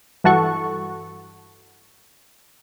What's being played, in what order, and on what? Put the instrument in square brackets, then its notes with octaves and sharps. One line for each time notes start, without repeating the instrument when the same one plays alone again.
[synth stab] G2 E3 F#4 A4 F#5 C#6